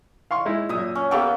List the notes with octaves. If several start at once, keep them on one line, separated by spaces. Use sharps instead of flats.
F5 C6 C#6
G#3 D#4 E4
F#2 A#2 E5 D#6
C#4
A#3 B3 C#4 G4 A4 G5